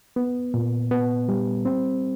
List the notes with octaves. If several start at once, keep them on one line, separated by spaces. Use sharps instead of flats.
B3
A#2
B3
G3
C4